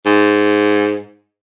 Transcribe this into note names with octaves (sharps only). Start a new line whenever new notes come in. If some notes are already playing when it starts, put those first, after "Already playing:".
G#2